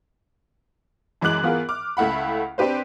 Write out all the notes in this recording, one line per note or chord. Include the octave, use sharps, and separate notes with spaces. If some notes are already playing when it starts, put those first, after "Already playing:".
F#2 E3 G#3 D6 F#6 F#7
E3 B3 F4 G#4 A#4
D6 F6
C#2 A3 E4 F#5 B5
C4 D4 G4 B4 C5